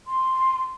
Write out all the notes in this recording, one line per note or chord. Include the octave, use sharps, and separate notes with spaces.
C6